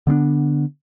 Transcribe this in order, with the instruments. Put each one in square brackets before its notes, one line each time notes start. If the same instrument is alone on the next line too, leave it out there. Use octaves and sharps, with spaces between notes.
[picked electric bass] D3 B3 C4 D4